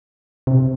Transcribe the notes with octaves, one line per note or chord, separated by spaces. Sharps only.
C3